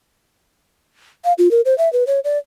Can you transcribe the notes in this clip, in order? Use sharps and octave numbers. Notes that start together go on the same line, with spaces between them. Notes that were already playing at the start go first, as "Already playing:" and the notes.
F5
F4
A#4
C5
E5
B4
C#5
D5